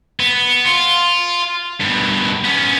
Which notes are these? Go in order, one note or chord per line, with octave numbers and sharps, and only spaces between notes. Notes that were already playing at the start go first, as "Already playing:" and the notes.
B3
F4
G2 B2
B3 C#4